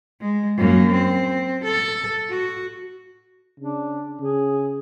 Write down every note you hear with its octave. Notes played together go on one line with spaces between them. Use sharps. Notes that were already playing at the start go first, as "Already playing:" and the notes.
G#3
F#2 A#3
C4
A4
F#4
C#3 D4
C#3 G#4